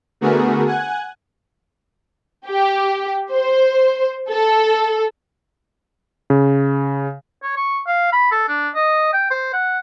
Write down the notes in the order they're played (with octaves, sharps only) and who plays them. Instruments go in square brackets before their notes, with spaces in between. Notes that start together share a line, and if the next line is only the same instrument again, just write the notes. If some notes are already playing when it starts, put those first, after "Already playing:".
[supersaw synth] D3 A3 B3 F#4 G#4 A#4
F#5 G#5 F#6 G#6
[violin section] G4
C5
A4
[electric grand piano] C#3
[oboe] C#5
C#6
F5
B5
A4
D4
D#5
G5
C5
F#5